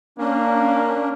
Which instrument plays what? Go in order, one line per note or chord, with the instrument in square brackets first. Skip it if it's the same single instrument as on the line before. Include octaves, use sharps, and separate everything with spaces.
[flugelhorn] A#3 [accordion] C#4 D4